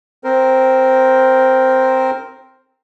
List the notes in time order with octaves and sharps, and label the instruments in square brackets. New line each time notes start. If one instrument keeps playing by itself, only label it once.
[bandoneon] C4 A#4 C5